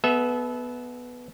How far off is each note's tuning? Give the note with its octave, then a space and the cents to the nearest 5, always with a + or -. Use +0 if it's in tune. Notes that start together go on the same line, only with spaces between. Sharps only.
B3 +0 A4 -35 E5 -15